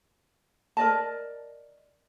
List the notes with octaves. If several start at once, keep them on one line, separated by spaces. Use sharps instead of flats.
A#4 D5 D#5 A5